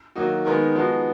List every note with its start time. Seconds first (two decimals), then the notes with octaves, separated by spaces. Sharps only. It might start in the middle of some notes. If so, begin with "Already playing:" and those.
0.15 D#3 F#3 A#3 D#4 F#4
0.45 D#3 G#3 B3 D#4 A#4
0.75 F3 G#3 B3 D#4 F#4